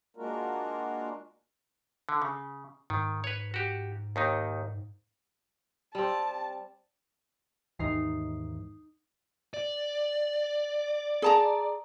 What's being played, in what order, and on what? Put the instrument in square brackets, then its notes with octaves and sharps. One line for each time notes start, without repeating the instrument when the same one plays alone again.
[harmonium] G#3 A#3 D4 F4 F#4 A#4
[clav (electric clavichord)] D3
C#3
[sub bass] G#2 [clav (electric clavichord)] D#3
[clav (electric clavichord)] B4 C#5
F#4 G4
D#2 D#3 D#4
[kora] G3 C4 [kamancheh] A5
[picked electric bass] D#2 G#2 E3 [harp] D#4 C7
[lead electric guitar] D5
[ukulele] G#4 A5 A#5